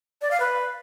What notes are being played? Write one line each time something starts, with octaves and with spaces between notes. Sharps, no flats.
D5
F5
B4